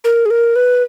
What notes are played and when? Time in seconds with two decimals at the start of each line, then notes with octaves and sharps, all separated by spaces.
0.04 A#4
0.26 G#4
0.30 A#4
0.56 B4